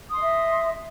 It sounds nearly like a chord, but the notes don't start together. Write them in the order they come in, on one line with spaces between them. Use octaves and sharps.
D#6 C6 D#5 E5